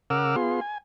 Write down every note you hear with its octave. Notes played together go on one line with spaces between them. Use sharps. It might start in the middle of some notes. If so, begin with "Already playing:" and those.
C#3 A#4 F#5 D6 E6 F6
B3 F4 G#4 C6
G#5